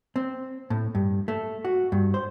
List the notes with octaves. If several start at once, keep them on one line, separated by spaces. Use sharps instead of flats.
C4
A2
G2
A3
F#4
G2
C5